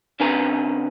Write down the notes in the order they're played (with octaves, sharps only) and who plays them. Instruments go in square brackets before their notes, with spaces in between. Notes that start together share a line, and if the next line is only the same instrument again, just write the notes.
[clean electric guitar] C#3 C4 D4 B4 G#5 A#5